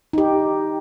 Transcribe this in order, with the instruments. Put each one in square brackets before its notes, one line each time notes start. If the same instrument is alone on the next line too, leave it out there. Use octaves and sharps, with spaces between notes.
[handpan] D#4 G4